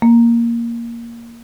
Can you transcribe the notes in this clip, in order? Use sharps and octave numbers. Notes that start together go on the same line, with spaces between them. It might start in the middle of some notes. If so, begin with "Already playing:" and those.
A#3